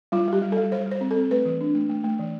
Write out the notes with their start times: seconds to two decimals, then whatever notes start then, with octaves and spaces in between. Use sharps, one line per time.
0.12 G3 F4
0.28 G3
0.33 G4
0.42 G3
0.52 G3 A4
0.72 G3 C5
0.87 G3 C5
1.01 C4
1.11 A4
1.16 C4
1.31 A3 B4
1.45 E3
1.61 D4
1.75 A3
1.90 A3
2.04 A3
2.20 E3